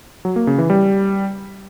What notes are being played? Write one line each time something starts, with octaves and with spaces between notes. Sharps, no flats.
F#3
A#3
C#3
E3
G3